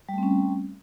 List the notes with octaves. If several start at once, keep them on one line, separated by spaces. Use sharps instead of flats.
G3 A3 C4 C#4